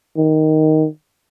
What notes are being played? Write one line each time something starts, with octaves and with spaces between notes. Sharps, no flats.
D#3